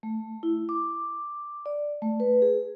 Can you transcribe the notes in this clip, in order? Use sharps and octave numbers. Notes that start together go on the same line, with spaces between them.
A3
E4
D6
D5
A3
B4
G#4